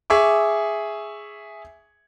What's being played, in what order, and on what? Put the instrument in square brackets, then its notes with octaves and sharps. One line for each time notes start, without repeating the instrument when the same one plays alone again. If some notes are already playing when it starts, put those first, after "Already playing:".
[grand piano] G#4 E5 C#6 D6